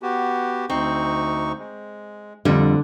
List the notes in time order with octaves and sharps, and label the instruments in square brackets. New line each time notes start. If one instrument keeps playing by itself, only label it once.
[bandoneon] B3 F#4 G4
[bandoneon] D2 D#4 C#6 [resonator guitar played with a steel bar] C4
[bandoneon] G#3
[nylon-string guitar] F2 G3 [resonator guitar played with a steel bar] D3